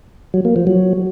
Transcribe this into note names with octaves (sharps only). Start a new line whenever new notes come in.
F#3
A#3
F3
F#3